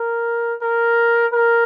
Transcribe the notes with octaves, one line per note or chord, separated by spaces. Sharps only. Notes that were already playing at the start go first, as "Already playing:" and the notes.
Already playing: A#4
A#4
A#4